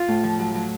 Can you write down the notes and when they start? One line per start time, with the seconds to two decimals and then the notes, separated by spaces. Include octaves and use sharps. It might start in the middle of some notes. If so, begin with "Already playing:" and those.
Already playing: F4
0.08 A2
0.24 F3
0.39 F#3
0.55 F#3